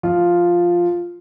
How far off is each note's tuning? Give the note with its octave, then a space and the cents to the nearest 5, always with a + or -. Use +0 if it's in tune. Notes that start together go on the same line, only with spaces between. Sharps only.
F3 +0 F4 +0